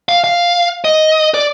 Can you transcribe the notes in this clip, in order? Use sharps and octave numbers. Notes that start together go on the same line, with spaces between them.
F5
F5
D#5
D5